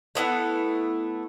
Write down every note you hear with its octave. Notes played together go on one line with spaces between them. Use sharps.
A3 B3 E4 F#5